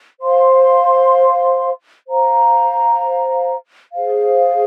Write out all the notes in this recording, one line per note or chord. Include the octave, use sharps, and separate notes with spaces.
C5 F5 C6
C5 F5 A#5
G#4 C5 F5